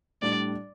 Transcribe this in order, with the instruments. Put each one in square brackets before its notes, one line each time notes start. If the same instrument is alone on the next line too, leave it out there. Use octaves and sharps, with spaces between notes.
[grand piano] A2 G3 D4 [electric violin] D5